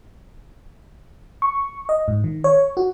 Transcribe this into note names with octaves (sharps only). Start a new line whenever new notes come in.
C#6
D#5
G#2
D#3
C#5
F#4